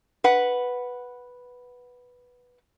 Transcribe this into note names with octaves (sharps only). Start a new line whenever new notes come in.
B4 F#5